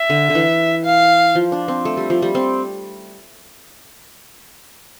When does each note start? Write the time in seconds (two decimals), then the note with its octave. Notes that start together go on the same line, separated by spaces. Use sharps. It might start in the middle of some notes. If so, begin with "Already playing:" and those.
Already playing: E5
0.10 D3
0.30 D3
0.35 E3
0.85 F5
1.35 F3
1.52 D4
1.68 C4
1.85 A3
1.97 G3
2.10 F3
2.22 G3
2.35 C4